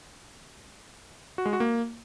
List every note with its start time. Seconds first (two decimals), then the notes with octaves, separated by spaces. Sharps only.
1.38 F#4
1.46 G#3
1.53 F#4
1.60 A#3